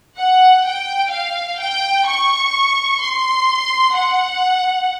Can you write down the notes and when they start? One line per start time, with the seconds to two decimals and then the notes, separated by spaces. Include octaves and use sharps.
0.17 F#5
0.64 G5
1.10 F5
1.58 G5
2.05 C#6
3.00 C6
3.95 F#5